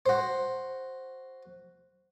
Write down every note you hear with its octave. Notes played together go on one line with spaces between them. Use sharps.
F#4 C5